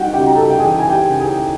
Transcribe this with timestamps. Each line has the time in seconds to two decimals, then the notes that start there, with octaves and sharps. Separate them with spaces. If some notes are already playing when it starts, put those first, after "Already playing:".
Already playing: G3 D#4 F#4 D#5 F#5 G5
0.13 C#3 G4 G5
0.27 A#5
0.36 A4 A5
0.50 G5
0.59 E3 G#4 G#5
0.79 G#5
0.89 G4 G5
1.05 C#3
1.20 G#4 G#5